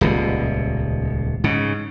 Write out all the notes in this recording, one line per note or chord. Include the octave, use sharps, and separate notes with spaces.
D#1 C#2 B2
G#2 C#3